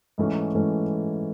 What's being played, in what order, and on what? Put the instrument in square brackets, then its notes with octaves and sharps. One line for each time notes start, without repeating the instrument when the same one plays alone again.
[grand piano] G#2 E3 A3 C#4
G#2 E3 A3 C#4